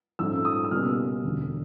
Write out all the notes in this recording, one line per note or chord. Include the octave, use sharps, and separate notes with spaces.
A#1 G#2 F3 A3 C#4 E6
D#6
E6
C#2 B2 G3 A#3 C#4 F6
E1 D2 D3